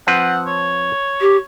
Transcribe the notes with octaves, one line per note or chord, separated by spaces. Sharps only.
F3 C4 B4 F#5
C#5
G4